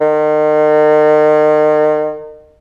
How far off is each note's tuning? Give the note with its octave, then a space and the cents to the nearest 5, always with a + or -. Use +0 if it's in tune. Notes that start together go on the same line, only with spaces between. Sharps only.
D#3 -35